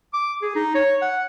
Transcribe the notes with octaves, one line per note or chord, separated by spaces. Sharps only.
D6
G#4
D#4
C#5
F#5